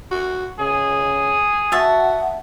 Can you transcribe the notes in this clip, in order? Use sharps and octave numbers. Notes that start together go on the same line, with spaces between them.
F#4
C#3 G#4
F#4 E5 F#5 A5